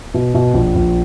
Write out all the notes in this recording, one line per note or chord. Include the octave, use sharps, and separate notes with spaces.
B2
B2
A#1
A#1